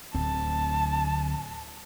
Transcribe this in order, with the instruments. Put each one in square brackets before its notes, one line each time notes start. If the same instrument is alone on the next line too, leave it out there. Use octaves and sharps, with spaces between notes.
[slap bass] D1 D2 C4 [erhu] A5